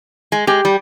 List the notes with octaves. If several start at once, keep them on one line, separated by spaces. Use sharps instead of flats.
G#3
G#3 G4
G3